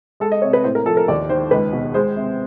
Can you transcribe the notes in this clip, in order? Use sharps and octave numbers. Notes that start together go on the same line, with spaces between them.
G#3 A4
D#5
C3 C#5
B4
A2 C5
A#4
F3 A4
A#4
D#2 D5
D#3 C5
C#2 B4
B2
G#3 C5
C3